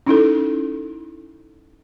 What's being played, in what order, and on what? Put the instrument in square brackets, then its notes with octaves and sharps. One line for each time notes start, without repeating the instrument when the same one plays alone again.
[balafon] C#4 D#4 E4 A4